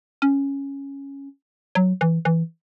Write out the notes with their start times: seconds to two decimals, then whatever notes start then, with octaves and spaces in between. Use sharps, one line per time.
0.22 C#4
1.75 F#3
2.01 E3
2.25 E3